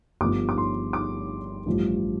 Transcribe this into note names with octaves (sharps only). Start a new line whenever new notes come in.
G1 G2 F3 D6
D6
C6
D6
A1 G2 F3